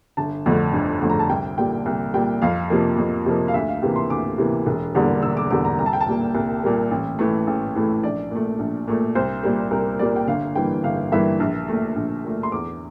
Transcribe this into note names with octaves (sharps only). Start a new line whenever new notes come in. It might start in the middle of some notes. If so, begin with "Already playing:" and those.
G1 A5
F2 D3 A3
G1
F2 D3 A3
A#5
A5
C2 G5
A#2 G3 G5
C2
A#2 G3 G5
F2 F5
C3 F3 A#3
F2
C3 F3 A#3
F5
D2 E5
F5
C3 E3 A#3 G5
C6
D2 D6
C3 E3 A#3
E1
E2 D3 G3 A#3
E1 E6
D6
E2 D3 G3 A#3 D6
A#5
C2 A#5
A5
G5
A5
A#2 G3 A#3
C2
A#2 G3 A#3
A1
A2 E3 A3
A1
A2 E3 A3
A#1 D5
A#2 A3
A#1
A#2 A3
C2 C5
A#2 G3 A#3
C2 A#4
A#2 G3 A#3 D5
G5
G1 F5
G2 E3 A#3 G5
G1 F5
G2 E3 A#3 E5
A#1
A#2 A3
A#1
A#2 A3
C6
E2 D6